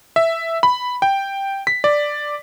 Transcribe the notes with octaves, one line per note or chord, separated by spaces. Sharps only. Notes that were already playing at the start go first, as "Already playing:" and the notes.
E5
B5
G5
B6
D5